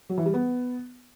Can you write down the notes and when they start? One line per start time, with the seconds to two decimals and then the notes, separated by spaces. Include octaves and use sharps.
0.09 F#3
0.18 E3
0.26 G3
0.34 B3